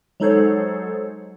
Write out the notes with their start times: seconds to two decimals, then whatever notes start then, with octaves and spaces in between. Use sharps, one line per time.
0.20 F#3 G#3 D#4 A4 C5 C#5